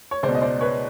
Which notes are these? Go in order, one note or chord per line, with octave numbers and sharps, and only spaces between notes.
C#5
C#2 C5 D5
B2
D#5
C5 D5
B4 C#5